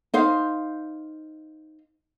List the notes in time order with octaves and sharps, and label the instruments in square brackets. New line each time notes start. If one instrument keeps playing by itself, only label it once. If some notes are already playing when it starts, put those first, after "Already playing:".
[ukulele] D#4 C5 F5